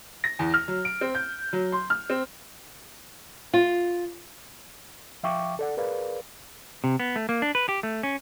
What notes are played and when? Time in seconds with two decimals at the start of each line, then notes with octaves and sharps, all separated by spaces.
0.24 A#6
0.39 E2
0.54 F6
0.68 F#3
0.85 D7
1.01 C4
1.15 G6
1.53 F#3
1.72 C6
1.90 F6
2.10 C4
3.53 F4
5.23 F3 E5 F5 G5 C#6 D6
5.59 A4 D5 F#5
5.77 G#4 A#4 B4 D5 F5
6.84 C3
7.00 B3
7.16 A3
7.29 A#3
7.42 D4
7.55 B4
7.69 G4
7.83 A3
8.03 C#4